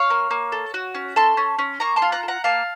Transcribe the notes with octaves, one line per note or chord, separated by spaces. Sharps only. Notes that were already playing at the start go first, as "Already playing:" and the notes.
Already playing: C#5 F5
A#3
A#3
A4
F#4
C#4
A4 A5 C6
C#4
C#4
A#3 A#5 C#6
A5 C6
F4
F#5 A#5
A4
F#5 A#5
A#3 F5 A5